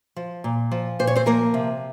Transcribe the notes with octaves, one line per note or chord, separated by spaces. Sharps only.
F3
A#2
F3
A#2 C5
C#5
C4 C5
F3 A#3 A#4
C3